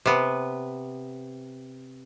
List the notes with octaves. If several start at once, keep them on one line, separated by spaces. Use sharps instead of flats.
C3 B3